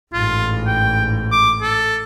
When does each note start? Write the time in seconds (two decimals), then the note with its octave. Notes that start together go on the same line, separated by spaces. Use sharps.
0.13 A1 G#2 F4
0.67 G5
1.32 D6
1.62 A4